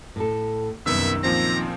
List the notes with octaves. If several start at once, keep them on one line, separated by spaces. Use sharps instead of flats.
A2 A4
C2 F#2 D#3 B3 E5 E6
A#2 F3 C4 A#5